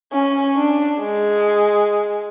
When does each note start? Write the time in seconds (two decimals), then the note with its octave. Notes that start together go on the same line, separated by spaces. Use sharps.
0.13 C#4
0.57 D4
1.00 G#3